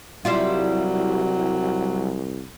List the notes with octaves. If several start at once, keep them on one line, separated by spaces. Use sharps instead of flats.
C2 F#3 G3 E4 F4